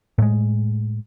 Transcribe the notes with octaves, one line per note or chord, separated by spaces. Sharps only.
A2 G#3